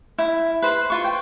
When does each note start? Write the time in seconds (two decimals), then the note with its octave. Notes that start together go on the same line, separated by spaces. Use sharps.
0.18 E4
0.62 B4 C5
0.90 F4 C#6
1.04 G5